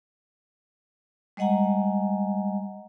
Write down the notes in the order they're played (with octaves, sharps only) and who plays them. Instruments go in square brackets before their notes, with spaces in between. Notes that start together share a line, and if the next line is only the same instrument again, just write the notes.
[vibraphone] G3 G#3 D#5 F#5 G#5 A#5